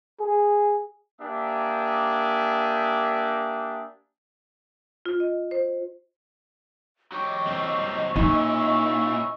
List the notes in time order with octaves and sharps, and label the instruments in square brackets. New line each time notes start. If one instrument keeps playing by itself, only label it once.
[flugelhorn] G#4
[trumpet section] A#3 D4 G4 E5 G#5 D#6
[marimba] F4
D#5
C5
[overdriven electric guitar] F#3 G4 [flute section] D#5 C#6
[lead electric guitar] C4 D4
[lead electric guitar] A#2 [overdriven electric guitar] C#4 E4 [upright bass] D#4